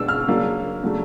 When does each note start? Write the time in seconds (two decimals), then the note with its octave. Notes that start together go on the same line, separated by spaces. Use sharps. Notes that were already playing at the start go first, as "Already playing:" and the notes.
Already playing: B2 G#3 B3 D4 E6
0.08 F6
0.27 C#3 F#3 A#3 D4
0.83 C#3 F#3 A3 D4